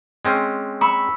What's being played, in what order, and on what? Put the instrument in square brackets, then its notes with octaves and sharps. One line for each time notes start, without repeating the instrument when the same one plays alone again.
[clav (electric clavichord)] G#3 C4 C#4
[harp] B5 C#6 E6